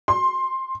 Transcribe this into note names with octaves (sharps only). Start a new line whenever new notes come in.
C6